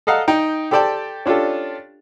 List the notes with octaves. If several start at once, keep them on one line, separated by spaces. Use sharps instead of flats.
A4 D#5 F5 F#5 A#5
D#4 G5
G4 A4 C5 D5 G5 A5
C#4 D4 F4 G4 A4